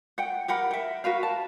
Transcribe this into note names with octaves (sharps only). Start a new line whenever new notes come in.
F#5 G5
G4 A#4 F#5 B5
E5 G5
F#4 A#4 B4 F5
A5